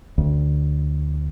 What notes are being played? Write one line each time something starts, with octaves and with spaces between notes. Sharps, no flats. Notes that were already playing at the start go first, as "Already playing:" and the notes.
D2